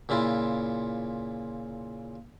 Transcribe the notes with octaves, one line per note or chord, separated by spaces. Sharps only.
A#2 C#3 E4 F4